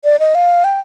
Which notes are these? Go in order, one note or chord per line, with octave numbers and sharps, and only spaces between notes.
D5
D#5
F5
G5